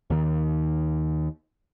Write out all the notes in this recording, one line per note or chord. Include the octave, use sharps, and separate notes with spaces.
D#2 D#3